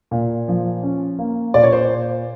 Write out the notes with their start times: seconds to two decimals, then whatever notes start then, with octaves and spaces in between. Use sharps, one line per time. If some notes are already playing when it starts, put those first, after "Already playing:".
0.11 A#2
0.48 F3
0.83 C#4
1.19 A#3
1.54 A#2 D5
1.63 C#5
1.72 C5